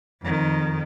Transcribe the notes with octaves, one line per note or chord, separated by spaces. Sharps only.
F2 D#3